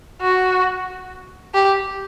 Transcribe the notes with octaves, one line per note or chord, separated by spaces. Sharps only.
F#4
G4